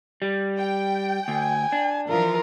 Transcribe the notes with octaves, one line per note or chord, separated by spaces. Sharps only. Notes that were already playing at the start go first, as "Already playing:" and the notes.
G3
G5
D2 G#5
D4
E3 F3 F4 A#4